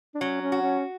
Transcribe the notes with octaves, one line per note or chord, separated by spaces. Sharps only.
D4
F#3 C#4
C#4
F#4
C#4